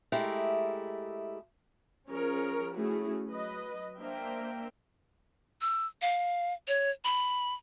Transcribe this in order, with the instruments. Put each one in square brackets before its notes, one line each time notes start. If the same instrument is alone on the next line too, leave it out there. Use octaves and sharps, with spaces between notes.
[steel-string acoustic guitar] G#3 A3 E4 G4 A#4
[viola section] F3 C#4 G#4 A#4 C#5
A3 C#4 E4 F#4 G#4
F#3 B4 D#5
A#3 D4 A#4 C5 E5 G5
[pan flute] E6
F5
C#5
B5